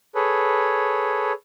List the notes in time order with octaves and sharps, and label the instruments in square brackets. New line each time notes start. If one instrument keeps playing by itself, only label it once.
[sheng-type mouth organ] G#4 A4 B4 C#5